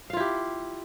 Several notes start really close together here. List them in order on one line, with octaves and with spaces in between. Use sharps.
F5 F4 E4 G4